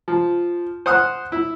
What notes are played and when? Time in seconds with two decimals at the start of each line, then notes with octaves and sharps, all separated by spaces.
0.08 F3
0.86 C5 F#5 D#6 F6 F#6
1.32 E4